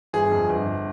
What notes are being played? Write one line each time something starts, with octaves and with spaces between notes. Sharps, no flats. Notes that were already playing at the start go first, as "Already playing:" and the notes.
G1 G#4
F2
G1